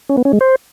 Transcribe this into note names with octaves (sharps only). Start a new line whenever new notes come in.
C#4
B3
C#4
G#3
C5